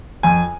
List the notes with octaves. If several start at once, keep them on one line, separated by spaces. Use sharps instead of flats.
F2 G#5